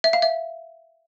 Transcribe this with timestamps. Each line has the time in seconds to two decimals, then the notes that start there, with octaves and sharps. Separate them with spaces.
0.04 E5
0.13 F5
0.22 E5